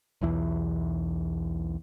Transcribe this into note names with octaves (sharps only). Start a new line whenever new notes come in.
B1 E2 E3